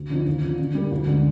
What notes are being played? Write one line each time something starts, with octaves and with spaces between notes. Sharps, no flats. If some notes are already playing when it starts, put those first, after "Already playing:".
Already playing: D2
D3 F3 C4 D#4
D#2
D3 F3
D3
G3 A#3
D2
D3 G#3